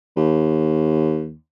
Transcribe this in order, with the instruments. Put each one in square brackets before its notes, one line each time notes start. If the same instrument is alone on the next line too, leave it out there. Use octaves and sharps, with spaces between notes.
[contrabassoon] D#2